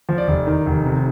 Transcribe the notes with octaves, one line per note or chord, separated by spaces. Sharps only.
F3
D5
F1
D#3
F1
C3